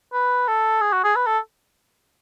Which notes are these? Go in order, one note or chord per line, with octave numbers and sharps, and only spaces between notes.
B4
A4
G#4
F#4
G#4
B4
A4